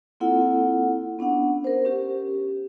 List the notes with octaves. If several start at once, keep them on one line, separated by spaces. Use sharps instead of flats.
A#3 C4 E4 F4 A4 F#5
B3 C#4 D4 F#5
A#4 C5
C#4 G4